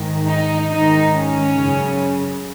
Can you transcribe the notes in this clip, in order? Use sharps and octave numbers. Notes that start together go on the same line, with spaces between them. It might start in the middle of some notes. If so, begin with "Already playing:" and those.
Already playing: G#2 D#3
D#4
G#2 D#3 D#4
C#4
F#2 C#3